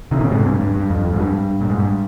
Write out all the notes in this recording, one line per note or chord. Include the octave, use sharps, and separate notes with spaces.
C3 D#3
A#2 C#3
G#2 C3
G2
G2
G2
F2
F2
G#2
G2
A#2
G#2
G2